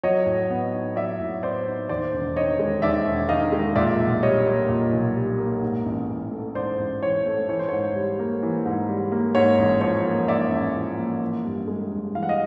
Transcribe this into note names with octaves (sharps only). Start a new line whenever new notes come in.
F#3 C#5 D#5
A2
B3
D#4
F#3 D5 E5
A2
B3 C5 D5
D#4
D#2 C5 D5
E1
D#3 C#5 D#5
G#3
D#2 D5 E5
E1
D#3 D#5 F5
G#3
A#2 D5 E5
B1
G3 C#5 D#5
A#3
A#2
B1
G3
A#3
G#2
A1
E3
A3
G#2 C5 D5
A1
E3 C#5
A3
E3 C#5
C5
G#2 C#5
G3
A#3
E3
G#2
G3
A#3
G#2 C#5
A1
F3 C#5
A#3
G#2 D5 E5
A1
F3
A#3
E3
G2
G#3
G2
E3 F5
F#5
D#5 F5